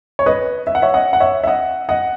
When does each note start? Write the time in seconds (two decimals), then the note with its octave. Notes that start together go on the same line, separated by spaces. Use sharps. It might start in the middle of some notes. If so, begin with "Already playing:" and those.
0.19 C#5
0.26 B4 D#5
0.67 E5
0.75 F#5
0.82 C#5 E5
0.94 D#5 F#5
1.13 F#5
1.20 C#5 E5
1.44 E5
1.47 D#5 F#5
1.89 D#5 F#5